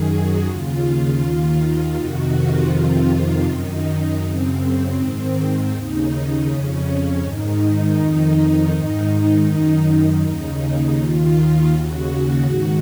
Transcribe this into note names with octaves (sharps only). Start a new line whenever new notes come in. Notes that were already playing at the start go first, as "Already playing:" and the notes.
Already playing: F#2 D#3 G#4
F#4
D#2 C#3 F4
D#2 D#3
F2 C3 D#3 F#4
F4
F2 C3 D#3 F4
F#2 D#3 D#4
F#2 C#3 C4
G#2 D#3 C4
D#2 D#4
C#3
F2 C#3 C#4
G#2 D#3 D#4
F2 D#3
G#2 D#3 D#4
F#2 D#3 D#4
D#2 C#3
D#2 D#3 F4
D#2 C#3 F#4
G#2 D#3